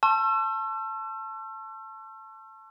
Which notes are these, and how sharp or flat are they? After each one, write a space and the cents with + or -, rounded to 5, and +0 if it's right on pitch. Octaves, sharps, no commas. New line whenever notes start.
A5 +0 C#6 -40 E6 +40